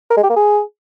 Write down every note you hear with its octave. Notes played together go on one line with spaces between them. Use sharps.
A#4
G#3
G4
A#3
G#4